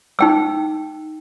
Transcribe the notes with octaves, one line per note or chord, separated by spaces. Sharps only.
D#4 G5 E6